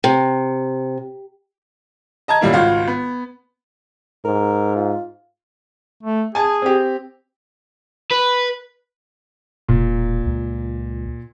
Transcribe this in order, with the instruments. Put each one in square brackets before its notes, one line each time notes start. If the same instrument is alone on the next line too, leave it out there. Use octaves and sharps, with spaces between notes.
[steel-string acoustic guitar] C3
[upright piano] D#5 A5 A#5 G#6
F#2 A#2 G3 A#3 E4
G#1 C#2 F4 F#4 F5
B3
[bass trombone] G#2 [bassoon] A#4
[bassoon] F4
[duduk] A3
[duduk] G#4 [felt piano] G#5 A5
[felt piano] C4 G4
[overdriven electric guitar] B4
[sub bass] E1 [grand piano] A#2
[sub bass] C#2